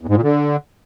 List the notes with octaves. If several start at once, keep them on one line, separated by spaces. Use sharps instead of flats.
E2
G#2
A#2
D3